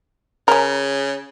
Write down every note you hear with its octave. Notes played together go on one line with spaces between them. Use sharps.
C#3 C#4 A#4